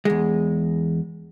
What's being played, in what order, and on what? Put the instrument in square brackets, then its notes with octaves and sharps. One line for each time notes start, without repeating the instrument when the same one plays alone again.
[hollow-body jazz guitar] E2 G#3